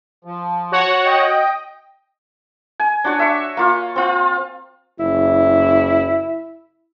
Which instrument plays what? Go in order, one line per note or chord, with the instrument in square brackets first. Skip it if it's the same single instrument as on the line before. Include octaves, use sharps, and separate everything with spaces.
[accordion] F3
[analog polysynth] F#4 C#5 F#5
[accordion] D#5 G5
[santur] G#5
D4 F#4 C#5
E5 C#6
A#3 F4
C4 F4
[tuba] F#1 [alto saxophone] E4